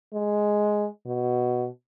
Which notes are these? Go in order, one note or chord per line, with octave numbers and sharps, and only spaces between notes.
G#3
B2